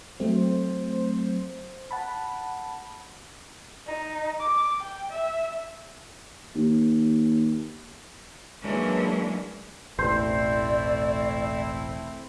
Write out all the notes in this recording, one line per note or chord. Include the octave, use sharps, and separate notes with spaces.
F#3 A3 C4 C5
F#5 A5 B5
D#4
D6
G5
E5
D#2
E3 F#3 G#3 A#3 C#4 D4
E1 A1 A3 C4 E4 C5 D5